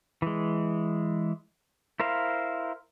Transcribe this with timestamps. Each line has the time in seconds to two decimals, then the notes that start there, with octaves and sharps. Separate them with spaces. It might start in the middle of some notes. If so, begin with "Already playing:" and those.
0.22 E3 G#3
2.00 E4 A#4 C5 F5